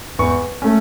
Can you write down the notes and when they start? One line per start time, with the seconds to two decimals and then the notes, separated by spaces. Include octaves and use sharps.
0.19 E2 C#6
0.62 A3 C#4